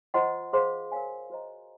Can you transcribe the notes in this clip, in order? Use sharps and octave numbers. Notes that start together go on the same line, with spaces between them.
F4 C5 D#5 F#5 C6
G#4 C5 F5 C6
A#4 C#5 F5 G#5
F#4 C5 D#5 A#5